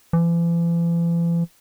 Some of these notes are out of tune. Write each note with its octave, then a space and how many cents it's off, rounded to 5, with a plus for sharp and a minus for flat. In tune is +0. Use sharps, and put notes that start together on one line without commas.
E3 +45